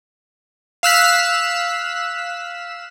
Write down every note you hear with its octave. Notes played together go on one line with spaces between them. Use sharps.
F5 E6 F#6 B6